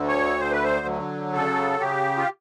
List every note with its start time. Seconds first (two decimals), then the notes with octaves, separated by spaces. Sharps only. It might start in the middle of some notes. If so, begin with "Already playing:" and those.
Already playing: D2 D3
0.08 C#5
0.39 D3 C5
0.52 B4
0.64 C5
0.86 F#3
1.33 C#3 A4
1.80 C#3 G4
2.17 F4